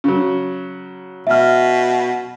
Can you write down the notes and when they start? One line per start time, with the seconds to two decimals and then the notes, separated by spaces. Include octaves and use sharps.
0.04 C#3 F#3
1.27 B2 E5 F6